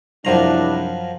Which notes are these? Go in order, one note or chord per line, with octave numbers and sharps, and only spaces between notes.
C2 F#2 F3 D4 E4 A#5